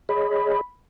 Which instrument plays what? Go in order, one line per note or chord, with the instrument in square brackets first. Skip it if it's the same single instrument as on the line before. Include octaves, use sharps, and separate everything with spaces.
[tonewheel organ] G#4 C#5 D#5 [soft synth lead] B5